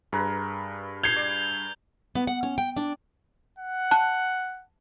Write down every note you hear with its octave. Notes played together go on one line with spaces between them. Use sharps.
G2 G#4 A#4 B4
G6 G#6 C7 F7 G7
D5
B3
F#5
C#4
G5
D4
F#5
A5 F#6